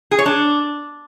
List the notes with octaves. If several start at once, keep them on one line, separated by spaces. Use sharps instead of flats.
G#4
C#5
D4